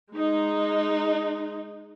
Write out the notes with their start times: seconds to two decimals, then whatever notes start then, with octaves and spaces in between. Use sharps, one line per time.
0.13 G#3 D#4